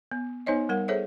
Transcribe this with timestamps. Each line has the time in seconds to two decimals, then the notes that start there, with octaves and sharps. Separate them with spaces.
0.12 B3
0.46 B3 D#4 C5 C#5 D#5
0.69 G3 A#4 F#5
0.88 G#4 A4 C5 C#5 E5